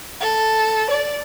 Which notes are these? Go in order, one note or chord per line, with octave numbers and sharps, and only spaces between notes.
A4
D5